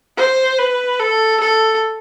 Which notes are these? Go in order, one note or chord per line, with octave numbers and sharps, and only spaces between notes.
C5
B4
A4
A4